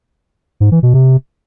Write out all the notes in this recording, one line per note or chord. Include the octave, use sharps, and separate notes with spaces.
G#2
E3
B2
C3